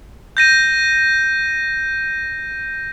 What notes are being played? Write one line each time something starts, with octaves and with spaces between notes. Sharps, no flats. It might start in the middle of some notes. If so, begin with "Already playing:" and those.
G6 A#6 D#7